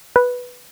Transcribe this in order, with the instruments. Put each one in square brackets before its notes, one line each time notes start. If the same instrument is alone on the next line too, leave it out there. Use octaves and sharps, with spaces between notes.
[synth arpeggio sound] B4